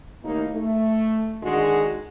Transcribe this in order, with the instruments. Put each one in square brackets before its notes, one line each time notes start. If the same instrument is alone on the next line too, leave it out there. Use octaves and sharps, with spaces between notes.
[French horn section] D#2 A2 A#3 D#4
A3
D3 D#3 G#3 F#4 G#4